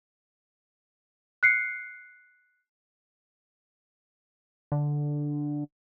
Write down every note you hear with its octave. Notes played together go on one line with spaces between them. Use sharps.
F#6 C7 C#7
D3